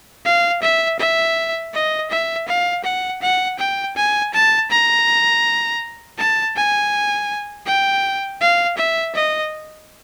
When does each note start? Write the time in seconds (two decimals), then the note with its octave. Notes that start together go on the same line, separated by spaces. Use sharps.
0.25 F5
0.62 E5
0.99 E5
1.74 D#5
2.11 E5
2.48 F5
2.84 F#5
3.22 F#5
3.59 G5
3.97 G#5
4.34 A5
4.71 A#5
6.18 A5
6.56 G#5
7.66 G5
8.41 F5
8.78 E5
9.15 D#5